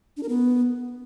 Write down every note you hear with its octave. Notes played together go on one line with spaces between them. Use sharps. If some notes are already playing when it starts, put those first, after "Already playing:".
D4
A#4
B3